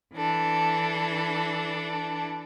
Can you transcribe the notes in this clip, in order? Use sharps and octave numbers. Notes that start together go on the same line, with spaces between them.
E3 D4 A4